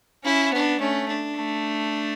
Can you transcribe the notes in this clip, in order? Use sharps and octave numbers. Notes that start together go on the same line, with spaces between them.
C#4 E4
B3 D4
A3 C#4
D4
A3